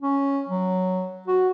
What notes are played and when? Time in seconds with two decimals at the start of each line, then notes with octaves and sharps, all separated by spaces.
0.02 C#4
0.49 F#3
1.28 F#4